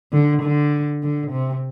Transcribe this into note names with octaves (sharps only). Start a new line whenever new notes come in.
D3
D3
D3
C3